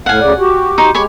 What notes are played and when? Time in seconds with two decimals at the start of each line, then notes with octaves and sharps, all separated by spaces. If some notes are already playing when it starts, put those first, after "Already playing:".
0.06 A2 F5 F#5 G#5
0.20 D2 C#3 D5
0.39 F#4 G4
0.78 D#4 C5
0.95 G#3 G4 C#5 G#5 B5